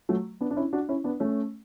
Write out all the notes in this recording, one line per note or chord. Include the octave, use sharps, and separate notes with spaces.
F#3 A3
B3 D4
D4
C#4 E4
D4 F#4
C#4 E4
B3 D4
A3 C#4